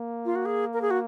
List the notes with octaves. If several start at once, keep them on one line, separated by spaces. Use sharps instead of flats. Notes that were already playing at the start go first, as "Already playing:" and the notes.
Already playing: A#3
F4
F#4
G#4
A#4
G#4
F#4